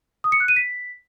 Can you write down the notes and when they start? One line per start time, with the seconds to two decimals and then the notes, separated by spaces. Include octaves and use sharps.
0.24 D#6
0.32 C#7
0.40 F#6
0.48 D#7
0.56 B6